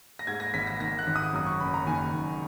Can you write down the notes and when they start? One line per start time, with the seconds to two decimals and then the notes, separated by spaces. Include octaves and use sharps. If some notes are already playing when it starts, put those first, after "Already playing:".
0.19 A#6
0.27 G#2 G#6
0.40 A#6
0.54 G#1 B6
0.67 A#6
0.80 D#3 A#6
0.99 F#6
1.07 G#1
1.16 D#6
1.33 F#2 D#6
1.47 C#6
1.60 F#1 B5
1.74 A#5
1.87 D#3 G#5
2.13 F#1